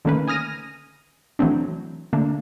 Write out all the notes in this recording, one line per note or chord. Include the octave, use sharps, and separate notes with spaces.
D3 D#3 A3 A#3 C#4 B4
G#5 D#6 F6 A#6 D#7
E3 F#3 A3 C4 D4
D3 A3 A#3 D4